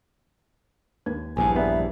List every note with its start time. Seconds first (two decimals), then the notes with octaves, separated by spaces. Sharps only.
1.06 D#2 B4 G#6
1.37 A#1 E2 G2 G#5
1.56 B3 D5 E5 A#5